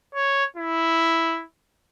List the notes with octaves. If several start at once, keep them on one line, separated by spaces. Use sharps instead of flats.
C#5
E4